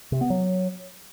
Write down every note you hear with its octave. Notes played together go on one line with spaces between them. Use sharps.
C3
B3
F#3